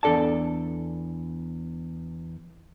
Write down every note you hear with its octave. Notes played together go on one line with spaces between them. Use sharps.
E2 D4 A4 D5 A5